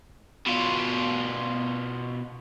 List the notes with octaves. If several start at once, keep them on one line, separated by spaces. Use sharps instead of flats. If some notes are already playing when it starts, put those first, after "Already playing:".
B2 F4